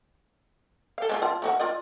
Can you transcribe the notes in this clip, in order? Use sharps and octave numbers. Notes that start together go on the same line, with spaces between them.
A4 F5
G#3 C#4 F4
F4 A5
A3 D#4 F#4
F4 D5 D#5